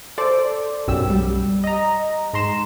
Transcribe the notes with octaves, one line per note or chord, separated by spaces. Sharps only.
A4 C5 D5
B1 F#2 G4 E6
G3
D#5 A#5
G#2 A#5 C6 E7